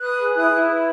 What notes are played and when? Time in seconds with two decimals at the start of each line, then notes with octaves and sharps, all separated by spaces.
0.01 B4 D#6 F#6
0.18 G#4
0.35 E4 D#6 F#6
0.52 E4
0.68 B4